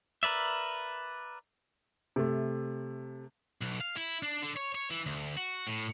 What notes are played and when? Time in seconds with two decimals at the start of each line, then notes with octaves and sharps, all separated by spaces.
0.23 A#4 B4 D5 E5
2.16 C3 A3
3.62 B1
3.81 F5
3.97 E4
4.23 D4
4.42 D3
4.56 C#5
4.75 C#5
4.90 E3
5.06 D2
5.37 F#4
5.67 A2